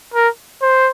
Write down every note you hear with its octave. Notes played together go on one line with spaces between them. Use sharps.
A#4
C5